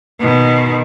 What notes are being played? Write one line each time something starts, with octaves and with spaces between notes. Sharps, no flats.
B2 D#3